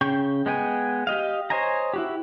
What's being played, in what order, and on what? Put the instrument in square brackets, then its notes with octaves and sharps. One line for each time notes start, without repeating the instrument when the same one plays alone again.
[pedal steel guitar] C#3 G5 C#6
G#3 B3 G5 G#5
G4 D#5 F5
C5 C#5 D#5 G#5 A#5
E4 F#4 G4